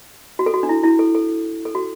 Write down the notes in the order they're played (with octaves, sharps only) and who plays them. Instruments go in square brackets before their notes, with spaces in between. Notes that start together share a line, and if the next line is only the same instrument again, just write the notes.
[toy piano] F#4
A4
F#4
D4
E4
E4
A4
A4
A4
F#4